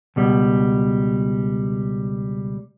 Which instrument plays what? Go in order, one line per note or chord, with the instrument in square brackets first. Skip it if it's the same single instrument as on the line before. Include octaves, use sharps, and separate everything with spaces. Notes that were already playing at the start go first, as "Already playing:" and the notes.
[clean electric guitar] C#2 B2 G3